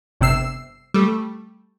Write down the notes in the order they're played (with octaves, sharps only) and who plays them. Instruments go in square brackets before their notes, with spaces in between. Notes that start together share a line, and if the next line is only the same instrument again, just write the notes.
[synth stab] G1 C3 E6 C7
G3 A3